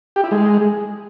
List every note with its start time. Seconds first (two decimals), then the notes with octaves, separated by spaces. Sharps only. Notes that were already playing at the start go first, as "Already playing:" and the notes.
0.16 G4
0.24 E4
0.31 G#3